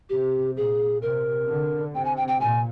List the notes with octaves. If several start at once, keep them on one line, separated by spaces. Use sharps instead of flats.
C3 G4
A#2 G#4
C3 A#4
D3
C3 G5
G#5
G5
G5
A#2 G#5